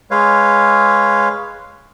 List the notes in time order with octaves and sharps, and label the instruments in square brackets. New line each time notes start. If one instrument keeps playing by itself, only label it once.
[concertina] G#3 B4 C#5 F5